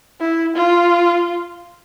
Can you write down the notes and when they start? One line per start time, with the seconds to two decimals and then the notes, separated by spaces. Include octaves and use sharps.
0.20 E4
0.55 F4